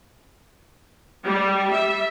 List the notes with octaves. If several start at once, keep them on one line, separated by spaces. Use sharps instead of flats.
G3
E5